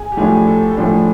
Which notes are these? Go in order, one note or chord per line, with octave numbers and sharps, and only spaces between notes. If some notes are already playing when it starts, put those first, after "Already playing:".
Already playing: G#4
G4
A2 F3 A3 D4 G#4
A4
A4
A2 F3 A3 D4 G#4